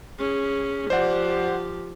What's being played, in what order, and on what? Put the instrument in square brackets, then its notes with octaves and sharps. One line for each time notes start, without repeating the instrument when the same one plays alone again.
[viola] C#4 G#4
[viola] F3 G4 [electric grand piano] C5 D5 F#5